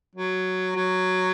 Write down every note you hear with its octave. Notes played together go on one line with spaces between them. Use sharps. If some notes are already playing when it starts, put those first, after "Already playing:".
F#3
F#3